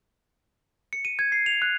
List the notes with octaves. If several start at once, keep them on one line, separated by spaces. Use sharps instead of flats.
C#7
D#7
G#6
C7
F7
F#6